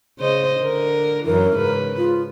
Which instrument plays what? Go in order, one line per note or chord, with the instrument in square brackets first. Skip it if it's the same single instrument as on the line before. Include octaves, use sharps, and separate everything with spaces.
[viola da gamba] C#3 C5 D#5
D3 A#4
[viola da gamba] F#2 E3 [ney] A#4
[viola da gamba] G#2 C#3 B4
[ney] F4